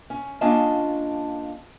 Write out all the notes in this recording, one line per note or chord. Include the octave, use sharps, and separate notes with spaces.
C#4
A#3 C#4 D4 F4 D#5 A5